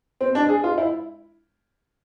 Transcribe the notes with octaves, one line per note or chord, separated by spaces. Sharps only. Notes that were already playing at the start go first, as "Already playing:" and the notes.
C4
D4
G#4
F4
E4